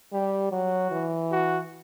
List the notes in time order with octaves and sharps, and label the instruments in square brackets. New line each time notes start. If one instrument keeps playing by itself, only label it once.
[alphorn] G3 [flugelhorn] G4
[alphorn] F#3 [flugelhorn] F#4
[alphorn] E3
[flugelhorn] F#4